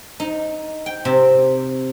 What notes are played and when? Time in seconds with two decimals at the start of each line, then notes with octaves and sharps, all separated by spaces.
0.20 D#4
0.86 G5
1.05 C3